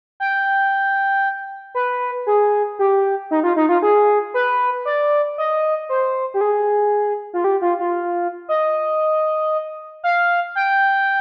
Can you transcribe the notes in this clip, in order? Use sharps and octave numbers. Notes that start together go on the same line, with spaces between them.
G5
B4
G#4
G4
D#4
F4
D#4
F4
G#4
B4
D5
D#5
C5
G4
G#4
F4
G4
F4
F4
D#5
F5
G5